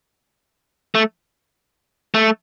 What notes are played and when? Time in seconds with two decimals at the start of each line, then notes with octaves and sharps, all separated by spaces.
0.95 A3
2.15 A3